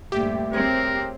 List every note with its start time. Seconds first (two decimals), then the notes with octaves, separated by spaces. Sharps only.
0.12 D2 G2 A#2 A3 G4 E5
0.53 C4 G#4 A#4 C#5